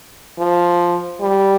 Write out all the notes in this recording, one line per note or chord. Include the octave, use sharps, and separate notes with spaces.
F3
G3